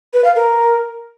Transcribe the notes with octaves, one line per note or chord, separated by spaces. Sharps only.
B4
F5
A#4